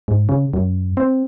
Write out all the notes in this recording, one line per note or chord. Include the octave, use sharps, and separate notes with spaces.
G#2
C#3
F#2
C4